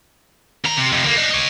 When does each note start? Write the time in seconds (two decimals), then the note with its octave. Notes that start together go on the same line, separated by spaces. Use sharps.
0.65 D#2 A#5
0.77 C3
0.92 F2 C3
1.04 D3 A#3
1.17 D4 D#4
1.31 C#5 D#5